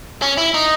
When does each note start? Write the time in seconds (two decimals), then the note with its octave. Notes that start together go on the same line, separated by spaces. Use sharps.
0.22 C#4
0.37 E4
0.54 D#4